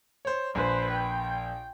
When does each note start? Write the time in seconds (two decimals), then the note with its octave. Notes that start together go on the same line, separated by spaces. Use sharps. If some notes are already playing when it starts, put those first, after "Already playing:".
0.25 C5 C#5
0.55 A#1 B4 C5 G#5
0.91 G5